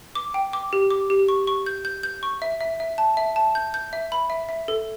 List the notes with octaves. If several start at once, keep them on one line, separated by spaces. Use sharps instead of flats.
D6
G5
D6
G4
D6
G4
C#6
C#6
G6
G6
G6
C#6
E5
E5
E5
A5
E5
A5
G6
G6
E5
B5
E5
E5
A4